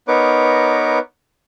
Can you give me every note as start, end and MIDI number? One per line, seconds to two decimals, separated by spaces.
0.08 0.99 59
0.08 0.99 63
0.08 0.99 70
0.08 0.99 71
0.08 0.99 73
0.08 0.99 86